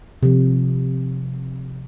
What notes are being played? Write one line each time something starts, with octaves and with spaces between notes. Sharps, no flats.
C3 F3